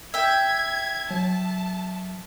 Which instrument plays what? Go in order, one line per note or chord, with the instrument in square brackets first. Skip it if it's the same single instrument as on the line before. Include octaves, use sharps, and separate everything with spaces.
[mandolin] E5 G5 [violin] G#6
[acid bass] F#3 [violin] A5